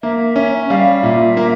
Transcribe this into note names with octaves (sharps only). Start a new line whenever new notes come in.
A#3 E5
C#4
G3 F5
A#2 E5
A#3